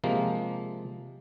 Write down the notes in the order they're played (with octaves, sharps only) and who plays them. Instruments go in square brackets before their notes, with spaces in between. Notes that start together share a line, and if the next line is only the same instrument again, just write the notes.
[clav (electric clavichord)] C3 F3 G#3 A#3